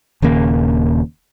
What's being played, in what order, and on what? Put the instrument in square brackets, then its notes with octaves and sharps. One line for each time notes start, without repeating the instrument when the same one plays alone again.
[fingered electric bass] D#1 D#2 C#3 A#3